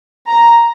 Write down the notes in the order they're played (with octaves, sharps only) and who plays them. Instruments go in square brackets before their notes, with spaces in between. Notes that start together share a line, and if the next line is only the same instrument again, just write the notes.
[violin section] A#5